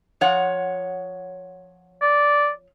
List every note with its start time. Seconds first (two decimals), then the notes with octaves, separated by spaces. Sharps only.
0.21 F3 C#5 F#5
2.02 D5